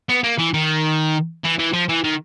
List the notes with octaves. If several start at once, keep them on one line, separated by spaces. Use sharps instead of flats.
B3
A#3
E3
D#3
E3
E3
F3
E3
D#3